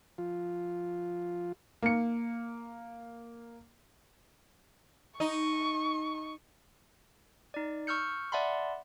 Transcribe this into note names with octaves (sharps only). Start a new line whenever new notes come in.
F3 F4
A#3 C#7
D#4 C#6
D#4 D5
C#6 E6 F6 G6 C#7
D5 E5 F#5 A5 B5 C6